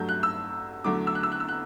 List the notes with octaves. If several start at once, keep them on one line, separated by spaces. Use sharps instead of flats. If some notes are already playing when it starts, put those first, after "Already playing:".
Already playing: G2 F#3 A3 G6
F#6
E6
E2 D3 F#3 A3 D6
E6
F#6
E6
F#6
E6
F#6